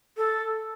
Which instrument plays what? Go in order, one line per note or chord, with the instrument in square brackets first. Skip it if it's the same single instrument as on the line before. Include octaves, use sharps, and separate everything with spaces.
[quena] A4